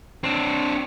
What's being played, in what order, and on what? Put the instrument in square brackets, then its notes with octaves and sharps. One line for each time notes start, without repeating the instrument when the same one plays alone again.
[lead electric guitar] C4 D4